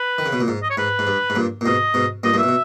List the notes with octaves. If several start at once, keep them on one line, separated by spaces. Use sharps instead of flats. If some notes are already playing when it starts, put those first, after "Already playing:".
Already playing: B4
D#3
C#3
B2
A#2
G#2
D#5
C#5
G#2 B4
G#2
G2
G#2
G2 A#2
A#2
G#2 B2 D#5
G#2 B2
G2 A#2 D#5
G2 A#2
B2 E5
B2